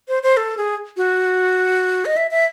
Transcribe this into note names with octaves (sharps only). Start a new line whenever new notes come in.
C5
C5
A4
G#4
F#4
D#5
E5
E5